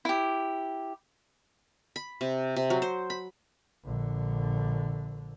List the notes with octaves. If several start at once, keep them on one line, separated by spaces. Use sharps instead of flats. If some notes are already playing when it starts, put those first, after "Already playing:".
E4 G4
B5
C3
C3
F#3
C5
B5
A#1 D3